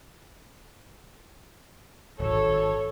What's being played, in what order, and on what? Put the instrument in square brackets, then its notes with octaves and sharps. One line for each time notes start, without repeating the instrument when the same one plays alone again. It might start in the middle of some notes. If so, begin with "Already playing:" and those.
[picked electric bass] D1 G#1 [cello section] A4 [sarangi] C#5